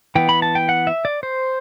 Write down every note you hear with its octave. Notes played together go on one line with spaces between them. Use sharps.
E3 B3 G5
B5
A5
G5
F#5
E5
D5
C5